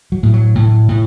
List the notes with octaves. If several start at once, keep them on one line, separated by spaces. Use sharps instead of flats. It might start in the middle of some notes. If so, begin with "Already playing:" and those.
F#3
A2
F#3
A2
A2